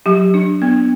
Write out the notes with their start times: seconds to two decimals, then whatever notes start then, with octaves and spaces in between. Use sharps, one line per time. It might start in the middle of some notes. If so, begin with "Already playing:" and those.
0.06 F#3 G4
0.34 D4
0.62 B3